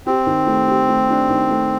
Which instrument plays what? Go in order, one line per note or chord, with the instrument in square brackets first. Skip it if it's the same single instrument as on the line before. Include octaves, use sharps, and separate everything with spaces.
[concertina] C4 [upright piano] G4
[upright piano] D#3
A3
G4
A3
D4
D#3
A3